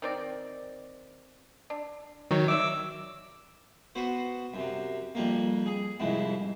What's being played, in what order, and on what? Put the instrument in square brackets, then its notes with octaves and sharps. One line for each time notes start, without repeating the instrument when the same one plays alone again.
[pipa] D#3 C4 D5
D4
[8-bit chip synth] D#3 F#3 [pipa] D#4 C#5
[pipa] D5 E5 [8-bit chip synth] D6 E6
[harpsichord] B3 F#4 C5
F#2 C3
F2 G3 A#3
G#4
C2 F2 G#2 E4